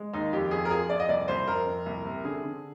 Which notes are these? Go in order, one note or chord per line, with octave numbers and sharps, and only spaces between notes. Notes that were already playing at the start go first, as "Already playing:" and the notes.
Already playing: G#3
D#2 D#4
F2 G4
F2 G#4
A#4
F3 G#4
F2 D5
D#5
C2 D5
C2 C5
F2 A#4
F2
C2
C3
D3 G#4
D3